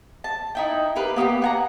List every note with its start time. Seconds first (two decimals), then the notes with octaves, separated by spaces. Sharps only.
0.24 A5
0.55 D#4 E4 G5
0.96 G4 A#4 B4 F5
1.16 A#3 B3 F#4 G4
1.42 F#5 G#5 A#5